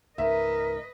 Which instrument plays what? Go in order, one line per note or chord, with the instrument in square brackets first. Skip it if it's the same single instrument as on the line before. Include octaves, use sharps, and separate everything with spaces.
[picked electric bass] C#2 G#2 [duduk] A#4 [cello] B4 D#5 [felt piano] E5